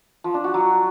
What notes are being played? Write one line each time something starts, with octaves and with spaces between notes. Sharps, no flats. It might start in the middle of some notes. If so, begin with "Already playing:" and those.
F3
D4
F#4
F#3